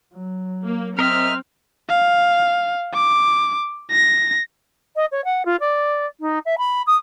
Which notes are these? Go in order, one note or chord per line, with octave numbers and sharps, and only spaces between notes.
F#3
A#3
C4 A#4 D#5 E5 F6
F5
D6
A#6
D#5
C#5
F#5
F4
D5
D#4
E5
B5
D#6